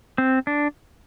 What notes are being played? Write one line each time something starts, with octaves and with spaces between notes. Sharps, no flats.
C4
D4